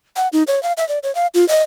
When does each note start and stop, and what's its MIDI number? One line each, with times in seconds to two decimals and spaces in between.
0.16 0.28 78
0.33 0.43 63
0.47 0.62 73
0.63 0.73 77
0.77 0.87 76
0.89 0.99 74
1.03 1.14 73
1.15 1.27 77
1.34 1.47 65
1.49 1.63 75